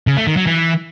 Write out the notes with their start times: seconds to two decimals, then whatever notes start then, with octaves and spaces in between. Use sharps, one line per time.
0.07 C#3
0.17 A3
0.27 D#3
0.37 F#3
0.47 E3